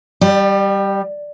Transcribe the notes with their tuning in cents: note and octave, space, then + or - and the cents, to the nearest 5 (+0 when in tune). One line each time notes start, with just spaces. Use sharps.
G3 +0 D5 +35